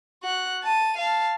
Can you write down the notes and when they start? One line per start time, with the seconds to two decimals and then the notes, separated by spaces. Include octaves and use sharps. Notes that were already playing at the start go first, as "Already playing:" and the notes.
0.23 F#4 F#6
0.63 A5 D#7
0.97 F5 A5